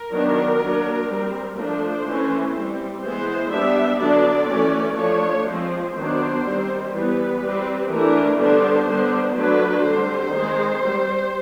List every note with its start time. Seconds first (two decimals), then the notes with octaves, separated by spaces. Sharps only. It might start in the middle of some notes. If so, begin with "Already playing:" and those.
Already playing: A#4
0.11 D#3 F#3 B3 D4
0.58 F#3 A#3 D4
1.07 G3 C4
1.56 F3 A3 D4 C5
2.04 E3 A3 C#4
2.54 G3 C4
3.02 E3 G#3 B3 C5
3.51 G3 B3 D4 E5
3.99 D3 F#3 B3 D4 D5
4.48 E3 A3 C#4
4.97 F3 A3 D4 C#5
5.46 F3 G#3 C4 C5
5.94 D#3 F#3 B3 D4 C5
6.44 D#3 G3 C4
6.92 E3 G3 B3 B4
7.41 G3 C4
7.89 E3 A3 D4 A#4
8.38 D3 G3 B3 D4 C5
8.88 D3 G3 B3 D4
9.35 F#3 A3 D4 B4
9.84 D3 G3 C4 C5
10.33 D#3 G#3 C4
10.82 G3 C4